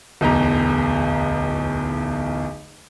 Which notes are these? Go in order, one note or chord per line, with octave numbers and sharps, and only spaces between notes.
D1 B1 E2 A#5